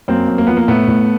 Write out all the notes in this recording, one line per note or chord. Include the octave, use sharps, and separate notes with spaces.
F#2 A#3 C4
F#2
A#3
F3 B3
A#3
A2 A3 B3
A2